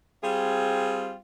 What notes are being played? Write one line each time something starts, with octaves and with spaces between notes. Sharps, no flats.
G3 C4 F4 G#4